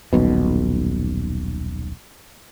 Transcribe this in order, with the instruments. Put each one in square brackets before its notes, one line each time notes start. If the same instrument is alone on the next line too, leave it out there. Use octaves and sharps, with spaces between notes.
[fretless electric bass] D#1 B1 B2